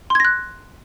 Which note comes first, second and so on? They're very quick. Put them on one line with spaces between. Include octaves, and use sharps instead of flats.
C6 G#6 A#6 F#6